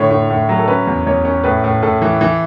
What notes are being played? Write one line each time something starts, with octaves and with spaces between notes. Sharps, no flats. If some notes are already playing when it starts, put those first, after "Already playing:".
Already playing: A2 D3 C#5
A2
A2
F#3
A4
C#4 B4
E2
E2 C#5
C#4
A2 B4
A2
A2 A4
E3
E3